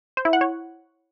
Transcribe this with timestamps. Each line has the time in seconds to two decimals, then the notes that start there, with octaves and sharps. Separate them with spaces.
0.17 C5
0.25 E4
0.33 F#5
0.41 C#5